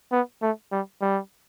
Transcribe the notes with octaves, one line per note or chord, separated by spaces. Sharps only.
B3
A3
G3
G3